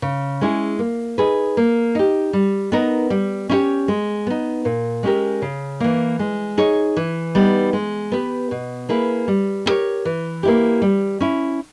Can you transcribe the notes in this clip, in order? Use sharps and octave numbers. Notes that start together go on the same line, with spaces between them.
C#3
G#3 C#4 E4 G#4
A#3
D#4 G#4 B4
A#3
D#4 G4
G3
B3 D#4 A#4
G3
C#4 E4 G4 C#5
G#3
B3 D#4
A#2
G#3 C#4 G4 A#4
C#3
E3 A#3
G#3
D#4 G#4 C#5
E3
G3 B3 D#4
G#3
B3 G4 B4
B2
A#3 E4 G#4 B4
G3
B3 G4 A#4 C#5
E3
A#3 E4 G4
G3
C#4 E4